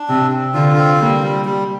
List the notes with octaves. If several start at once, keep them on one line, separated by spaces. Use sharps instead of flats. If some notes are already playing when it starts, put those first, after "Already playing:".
Already playing: D4
C3 C4
C4
D3 F4
C4
G3 A#3
G3
G3